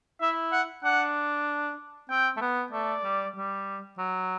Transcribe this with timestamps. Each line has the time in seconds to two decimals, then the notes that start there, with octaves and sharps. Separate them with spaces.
0.21 E4 E5
0.52 F#5
0.84 D4 F#5
2.09 C4 G5
2.36 A3
2.41 B3
2.72 A3 D5
3.04 G3
3.35 G3
3.98 F#3